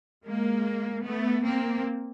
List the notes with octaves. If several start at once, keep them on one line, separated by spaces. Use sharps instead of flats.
G#3 A#3
A3 B3
A#3 C4